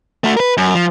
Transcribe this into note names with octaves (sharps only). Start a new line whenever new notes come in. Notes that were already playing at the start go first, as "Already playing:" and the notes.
A3 F#4
A#4 B4
F#2
F3